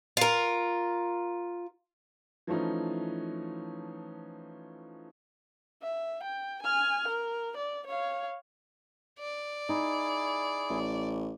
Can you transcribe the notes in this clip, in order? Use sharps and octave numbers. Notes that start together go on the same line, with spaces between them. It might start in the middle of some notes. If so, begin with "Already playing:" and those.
F4 A#4
E3 F3 A3 C#4 D#4
E5
G5
G#5 F6
A#4
D5
C#5 F5
D5
D#4 E4 G#4
A1